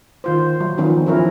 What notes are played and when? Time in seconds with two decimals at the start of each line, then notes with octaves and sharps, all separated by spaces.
0.24 D#3 F4 C5
0.60 F#3
0.78 D#3 F3 B3 C#4 D#4
1.06 F3 F#3 C#4 E4 A#4